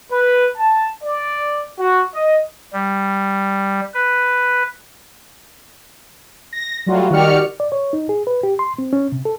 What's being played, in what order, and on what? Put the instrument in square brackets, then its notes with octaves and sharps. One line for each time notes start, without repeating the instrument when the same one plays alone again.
[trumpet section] B4
A5
D5
F#4
D#5
[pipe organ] G3
B4
[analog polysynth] A#6
F#3 G3 A3 F4 F#4
D#3 F#4 G4 D5 F6 C#7
[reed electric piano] D5
C#5
D#4
G#4
B4
G4
C6
C4
C#4
C3
A4